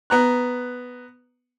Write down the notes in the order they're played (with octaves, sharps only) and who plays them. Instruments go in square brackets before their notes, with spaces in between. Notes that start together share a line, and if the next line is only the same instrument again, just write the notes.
[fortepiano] B3 A#5 F#6